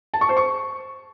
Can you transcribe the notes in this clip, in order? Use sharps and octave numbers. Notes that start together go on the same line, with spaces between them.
A5
C#6
C5
C#6